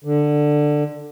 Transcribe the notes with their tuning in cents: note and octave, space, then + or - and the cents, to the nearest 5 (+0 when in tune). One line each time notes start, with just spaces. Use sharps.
D3 +10